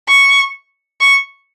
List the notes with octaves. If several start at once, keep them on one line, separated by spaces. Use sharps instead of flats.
C#6
C#6